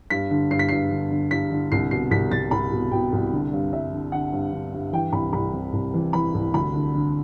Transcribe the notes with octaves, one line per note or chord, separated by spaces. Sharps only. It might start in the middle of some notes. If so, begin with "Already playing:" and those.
G2 B6
D3
G2 C7
B6
G2 C7
D3
D3
G2 B6
D3
C2 C7
B2 C7
C2 B6
C2 A6
C2 B5
B2
B2 G5
C2
D3
G2
G2 E5
D3
D3 F#5
G2
D3
G2
E3 G5
C2 B5
C2 B5
C3
C2
E3
E3 B5
C2
D2 B5
D3
D3